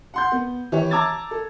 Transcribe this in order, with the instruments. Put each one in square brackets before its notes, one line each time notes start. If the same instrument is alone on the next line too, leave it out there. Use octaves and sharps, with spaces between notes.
[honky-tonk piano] F#5 C6 G6
B3
E3 G4 C#5
A5 A#5 D6 E6 G#6 A6
A4